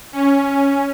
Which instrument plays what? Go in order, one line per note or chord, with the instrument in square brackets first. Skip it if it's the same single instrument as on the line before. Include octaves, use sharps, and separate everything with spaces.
[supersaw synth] C#4